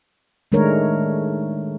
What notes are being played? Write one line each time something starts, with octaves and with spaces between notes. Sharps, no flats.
D#3 G#3 A3 D4 A#4 C#5